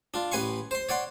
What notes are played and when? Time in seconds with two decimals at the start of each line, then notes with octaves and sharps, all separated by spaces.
0.14 D4 F4
0.32 A1 B4 G#5 C6 C#6
0.71 C5 C6
0.89 C#5 D5 F#5 C6